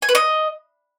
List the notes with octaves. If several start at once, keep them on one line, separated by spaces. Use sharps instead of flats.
G#5
B4
D#5